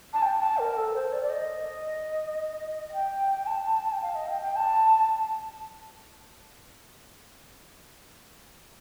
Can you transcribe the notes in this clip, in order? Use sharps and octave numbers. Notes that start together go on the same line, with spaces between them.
A5
G5
A5
A#4
A4
C5
D5
D5
D#5
G5
A5
G5
F5
D#5
G5
G5
A5